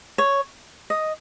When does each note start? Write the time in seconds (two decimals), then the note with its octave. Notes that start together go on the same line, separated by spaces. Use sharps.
0.18 C#5
0.90 D#5